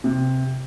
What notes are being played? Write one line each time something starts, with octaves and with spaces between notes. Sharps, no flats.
C3